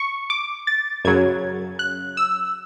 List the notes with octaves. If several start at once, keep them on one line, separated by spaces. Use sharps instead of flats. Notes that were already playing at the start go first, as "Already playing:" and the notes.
Already playing: C#6
D6
A6
F#2 C#3 F#3 G#6
F#6
E6